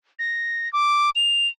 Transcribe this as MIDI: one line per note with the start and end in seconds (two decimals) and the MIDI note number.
0.19 0.71 94
0.73 1.10 86
1.16 1.48 101